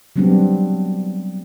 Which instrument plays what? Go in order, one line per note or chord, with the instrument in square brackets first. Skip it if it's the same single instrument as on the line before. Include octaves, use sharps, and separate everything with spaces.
[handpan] F#3 G3 B3 C4 D4